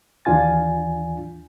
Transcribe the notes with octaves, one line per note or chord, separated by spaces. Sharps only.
D#2 E3 D4 F4 G#5 A6